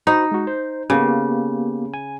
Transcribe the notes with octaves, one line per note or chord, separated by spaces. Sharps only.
D#4 F#4 C5 B5
G#3 F#4
C5
C#3 A#3 B3 G4
G#5